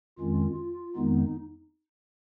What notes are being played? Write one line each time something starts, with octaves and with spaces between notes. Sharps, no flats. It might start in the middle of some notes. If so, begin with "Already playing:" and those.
F2 D#3 G#3 C#4 F4
F4
F2 D#3 G#3 B3 D#4